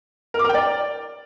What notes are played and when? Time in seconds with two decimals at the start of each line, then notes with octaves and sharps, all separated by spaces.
0.34 A#4
0.39 D6
0.44 A#4
0.49 G5
0.54 D5